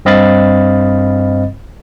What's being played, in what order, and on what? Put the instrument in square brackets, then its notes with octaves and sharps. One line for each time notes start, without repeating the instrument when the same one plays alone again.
[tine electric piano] G2 C4 D#5 F5 B5 A6